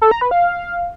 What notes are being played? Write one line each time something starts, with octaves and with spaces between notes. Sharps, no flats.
A4
A#5
B4
F5